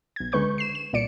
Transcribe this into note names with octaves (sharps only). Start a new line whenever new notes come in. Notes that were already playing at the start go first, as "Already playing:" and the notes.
B1 G#6
C#2 D3 G#3 B4 C#6 G6
C7 E7
E7
C2 A#2 D5 C#7 D7